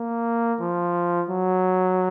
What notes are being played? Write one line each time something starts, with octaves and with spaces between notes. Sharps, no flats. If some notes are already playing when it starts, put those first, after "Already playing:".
Already playing: A#3
F3
F#3